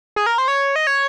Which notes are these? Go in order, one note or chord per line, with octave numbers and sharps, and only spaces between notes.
G#4
A#4
C5
C#5
D#5
C#5